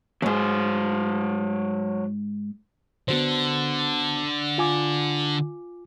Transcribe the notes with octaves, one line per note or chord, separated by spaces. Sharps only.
E2 G#2 F#3 C5
D3 B3 F#4 C5
F4 G#5 D6